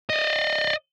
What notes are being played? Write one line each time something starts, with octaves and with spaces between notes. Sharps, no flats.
D5 D#5